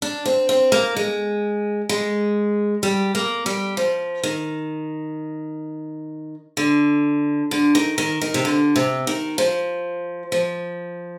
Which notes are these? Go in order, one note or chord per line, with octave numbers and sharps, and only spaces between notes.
D4
C4
C4
A#3
G#3
G#3
G3
A#3
G3
F3
D#3
D3
D3
D#3
D#3
D#3
C3
D3
C3
D#3
F3
F3